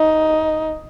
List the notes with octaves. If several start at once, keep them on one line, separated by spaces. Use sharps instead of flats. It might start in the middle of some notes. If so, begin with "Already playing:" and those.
Already playing: D#4